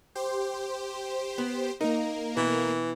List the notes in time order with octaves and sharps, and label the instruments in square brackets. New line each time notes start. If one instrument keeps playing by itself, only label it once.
[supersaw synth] G4 C5
[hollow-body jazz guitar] B3
[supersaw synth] A#3 A#4 [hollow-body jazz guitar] D#4
[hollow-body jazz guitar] B2 [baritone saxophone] E3